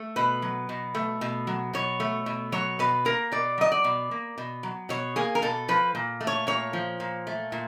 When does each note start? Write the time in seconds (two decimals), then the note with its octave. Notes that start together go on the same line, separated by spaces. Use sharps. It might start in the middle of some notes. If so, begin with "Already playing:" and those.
Already playing: A3
0.16 B2 B4
0.42 F#3
0.69 B2
0.95 A3
1.21 B2
1.47 F#3
1.73 B2 C#5
2.00 A3
2.26 B2
2.52 F#3 C#5
2.79 B2 B4
3.05 A#3 A#4
3.32 B2 D5
3.58 F#3 D#5
3.72 D5
3.84 B2
4.11 A#3
4.38 B2
4.63 F#3
4.89 B2 C#5
5.16 A#3 G#4
5.35 A#4
5.42 B2 A4
5.68 F3 B4
5.95 A#2
6.21 A3
6.27 C#5
6.47 A#2 C#5
6.73 F3
7.00 A#2
7.27 A3
7.52 A#2